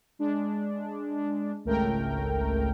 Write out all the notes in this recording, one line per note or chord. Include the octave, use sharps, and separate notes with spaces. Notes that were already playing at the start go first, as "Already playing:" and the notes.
G#3 D4
G#1 C#2 A3 A#4 G5